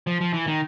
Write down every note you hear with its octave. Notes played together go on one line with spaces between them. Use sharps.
F3
F3
E3
D#3